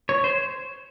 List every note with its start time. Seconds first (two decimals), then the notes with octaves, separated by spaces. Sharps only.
0.09 C#5
0.24 C5